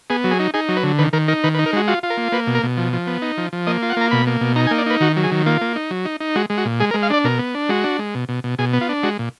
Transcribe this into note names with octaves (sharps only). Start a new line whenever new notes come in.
B3 G#4
F#3
G#4
D#4
D#4 G#4
F#3
B4
D3
D#3 B4
D#3 A#4
D#4 A#4
D#3 B4
B4
D#4
A#4
G#3 F#4
F4 F#4
F4
A#4
A#3
A#3 B4
B2
A#4
B2
F3
F3
B3
D#4
F3
F3
A#3 D#5
F4
F#5
A#3 A#5
B2 B5
A#3
B2
D#4 A#5
G#5
A#3
D5
D#4 B4
D#3 F#4
F#3
G#4
D#3
A#3 F4
A#3
D#4
F#3
D#4
D#4
G#3 F#4
G#3
F#4
A#2
G#3 G#4
A#4
G#3
F5
D4 D5
B2 A#4
B3
D4
G#3 F#4
D4
G#3
B2
B2
B2
B2 G#4
B3
F4
D4
G#3 F#4
A#2